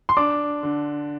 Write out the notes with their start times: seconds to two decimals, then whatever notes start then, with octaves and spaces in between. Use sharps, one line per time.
0.09 C6
0.17 D4 D6
0.63 D3